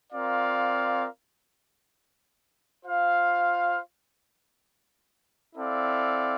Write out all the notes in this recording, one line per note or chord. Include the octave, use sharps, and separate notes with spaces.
C4 F4 A#4 D5 F5
F4 C5 F5
C4 E4 A4 D5 F5